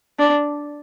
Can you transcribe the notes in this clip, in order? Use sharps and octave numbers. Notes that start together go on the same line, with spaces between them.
D4